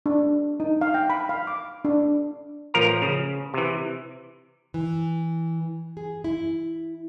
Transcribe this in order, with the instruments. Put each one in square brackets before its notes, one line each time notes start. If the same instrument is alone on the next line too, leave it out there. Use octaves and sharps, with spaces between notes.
[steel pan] D4
D#4
F5
G5
B5
F5
D6
D4
[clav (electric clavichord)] A1 F3 A#4 A#5
C#3
C3 E3
[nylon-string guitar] E3
G#4
E4